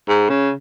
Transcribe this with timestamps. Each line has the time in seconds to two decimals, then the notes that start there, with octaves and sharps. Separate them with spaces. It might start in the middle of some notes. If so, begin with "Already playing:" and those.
0.09 G#2
0.29 C#3